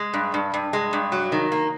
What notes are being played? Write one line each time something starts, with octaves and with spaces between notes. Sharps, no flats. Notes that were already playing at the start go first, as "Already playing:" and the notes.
Already playing: G#3
G2
G2
G2
G#3
G2
F#3
D#3
A#3